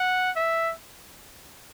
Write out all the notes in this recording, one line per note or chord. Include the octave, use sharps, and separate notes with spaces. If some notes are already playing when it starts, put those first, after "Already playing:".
Already playing: F#5
E5